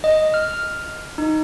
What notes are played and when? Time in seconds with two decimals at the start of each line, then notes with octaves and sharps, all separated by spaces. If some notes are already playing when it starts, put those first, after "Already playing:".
0.04 D#5
0.34 F6
1.18 D#4